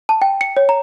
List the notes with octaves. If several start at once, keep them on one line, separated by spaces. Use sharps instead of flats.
A5
G5
C#7
C#5
A#5